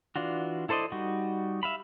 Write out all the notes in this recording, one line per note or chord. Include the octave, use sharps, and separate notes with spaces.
E3 D4 F4 F#4
E4 A4 C5 D5 D#5
G3 D#4 F#4
E5 F5 B5